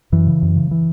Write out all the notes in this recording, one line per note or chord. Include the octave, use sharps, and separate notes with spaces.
F#2 E3
C#3
F#2
C#3
E3